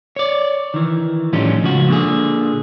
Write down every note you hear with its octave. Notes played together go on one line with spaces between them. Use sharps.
C#5 D5
D#3 E3
A2 D3 F3 G3 C#4 D#4
C#2 F3 F#4
A#2 D3 G#4